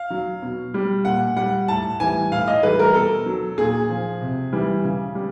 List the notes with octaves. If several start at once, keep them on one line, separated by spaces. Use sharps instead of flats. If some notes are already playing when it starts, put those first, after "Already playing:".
Already playing: F5
F#3
B2
G3
A#2 F#5
G3 F#5
A2 A5
E3 G3 G#5
A2 F5
D#5
E3 G3 B4
A#4
B2 A4
F#3
A#2 G#4
F3
C3
E3 G3
C#3
G3